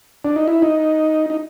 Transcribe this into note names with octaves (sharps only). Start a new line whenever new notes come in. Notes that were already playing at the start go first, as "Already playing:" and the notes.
D4
D#4
E4
D#4
D#4